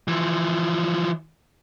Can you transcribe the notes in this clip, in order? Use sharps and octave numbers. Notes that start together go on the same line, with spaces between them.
E3 F3